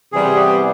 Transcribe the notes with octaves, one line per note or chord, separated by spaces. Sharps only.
C3 E3 G3 B3 G#4
G4